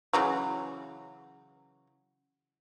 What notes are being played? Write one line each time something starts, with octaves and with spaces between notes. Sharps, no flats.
C#3 E3 F#3